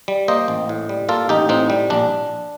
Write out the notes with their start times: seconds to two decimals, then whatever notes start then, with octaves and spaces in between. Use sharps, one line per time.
0.08 G3
0.28 A#3 C5 D#5
0.48 A1
0.69 A2
0.89 G3
1.09 A#3 F4 A4
1.29 A1 D#4 G4
1.49 A2 C4 D#4
1.70 G3
1.90 A#1 D4